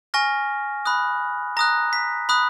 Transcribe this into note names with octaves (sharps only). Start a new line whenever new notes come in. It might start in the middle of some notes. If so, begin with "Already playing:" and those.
G#5 C#6 F6 A#6
B5 D#6 F#6
A#5 D#6 F#6 A#6
B6
B5 D#6 F#6